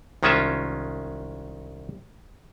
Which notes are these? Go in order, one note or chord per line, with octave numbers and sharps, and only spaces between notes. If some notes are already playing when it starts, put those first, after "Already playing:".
C2 D#3 G#3 C#4 F4 E5